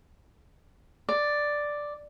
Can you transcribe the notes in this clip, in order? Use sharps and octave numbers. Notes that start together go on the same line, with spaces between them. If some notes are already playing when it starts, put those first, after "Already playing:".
D5